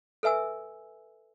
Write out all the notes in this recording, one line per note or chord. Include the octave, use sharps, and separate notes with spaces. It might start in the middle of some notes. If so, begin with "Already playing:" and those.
A4 B4 E5 G#5 E6